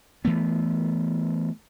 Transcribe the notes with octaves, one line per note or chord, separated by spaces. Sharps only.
E3 A3 B3